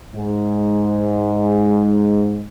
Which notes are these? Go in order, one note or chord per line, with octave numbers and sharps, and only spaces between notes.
G#2 G#3